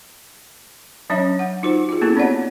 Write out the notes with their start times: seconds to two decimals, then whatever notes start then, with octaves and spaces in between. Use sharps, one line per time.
1.10 F#3 C#4 D4 C#5 E5
1.39 F#5
1.63 D#4 F4 F#4 C5
1.89 F4 G#4
2.01 A#3 B3 C#4 E4 F#4 A4
2.16 C4 D4 C#5 D5 F#5